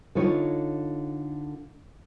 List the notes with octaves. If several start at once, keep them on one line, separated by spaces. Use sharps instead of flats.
D3 D#4 F4 C#5